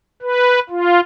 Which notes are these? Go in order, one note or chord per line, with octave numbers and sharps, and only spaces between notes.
B4
F4